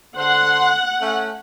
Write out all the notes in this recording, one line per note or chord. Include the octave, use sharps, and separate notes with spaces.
D3 C5 F#5 C6
A3 C#4